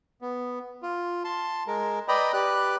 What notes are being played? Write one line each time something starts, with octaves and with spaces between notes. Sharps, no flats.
B3
F4
A5 C6
G#3 A#4
B4 D5 D#5 G5 A#5 B5
G4 B4 D5 F#6